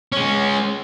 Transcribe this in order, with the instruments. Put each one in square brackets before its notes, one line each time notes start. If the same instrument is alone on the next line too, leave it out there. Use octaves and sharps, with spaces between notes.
[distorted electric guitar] G#3 C#4